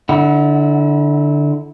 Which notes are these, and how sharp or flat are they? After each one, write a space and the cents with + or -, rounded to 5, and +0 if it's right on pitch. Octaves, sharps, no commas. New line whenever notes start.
D3 +0 E4 -30 F#5 +0